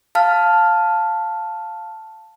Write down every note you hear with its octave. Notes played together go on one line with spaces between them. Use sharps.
F5 A5 F6